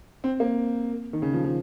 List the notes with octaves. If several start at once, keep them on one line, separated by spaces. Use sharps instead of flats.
C4
A#3
D#3
C#3
F3
F3